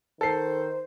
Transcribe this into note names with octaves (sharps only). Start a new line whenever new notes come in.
D#3 A4 C5 C7